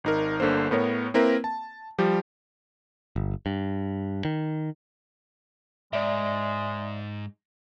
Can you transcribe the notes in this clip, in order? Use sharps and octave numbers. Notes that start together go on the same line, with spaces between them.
G#1 D#4 A#4
G1 D3 A#3 C5
A2 B3 A#4 C#5
A#3 C4 E4 A#4 B4
A5
F3 G3 G4
G1
G2
D#3
G#2 G#3 D5 E5